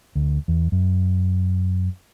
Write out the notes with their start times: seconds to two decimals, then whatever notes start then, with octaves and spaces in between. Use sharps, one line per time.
0.15 D2
0.48 E2
0.72 F#2